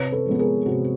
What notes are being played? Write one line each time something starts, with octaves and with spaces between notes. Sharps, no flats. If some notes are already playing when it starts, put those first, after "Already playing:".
Already playing: C3 B4 C#5
A4 B4
F3 G#3 B3
G#4 A#4
C3 F#4